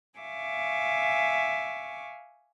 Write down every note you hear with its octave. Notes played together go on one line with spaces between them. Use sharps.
E5 F5 G#5 C#6 D6